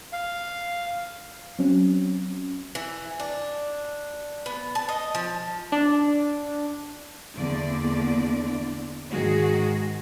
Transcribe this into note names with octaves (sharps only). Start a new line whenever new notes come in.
F5
F#3 C4 C#4
E3
D4
B3
A5
D#5
F3
D4
E2 D3 A#3 D5
G#2 D#3 F#4 G#4